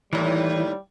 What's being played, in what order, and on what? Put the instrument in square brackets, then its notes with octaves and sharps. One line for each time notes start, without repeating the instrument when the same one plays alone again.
[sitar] D#2 A2 [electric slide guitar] E3 [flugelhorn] G3